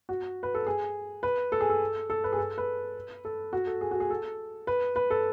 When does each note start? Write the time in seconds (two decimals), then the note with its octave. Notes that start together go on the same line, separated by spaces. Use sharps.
0.09 F#4
0.43 B4
0.54 A4
0.67 G#4
1.23 B4
1.52 A4
1.61 G#4
1.70 A4
2.10 A4
2.24 B4
2.32 G#4
2.38 A4
2.58 B4
3.25 A4
3.53 F#4
3.67 A4
3.81 G#4
3.91 F#4
4.00 G#4
4.10 A4
4.67 B4
4.96 B4
5.10 A4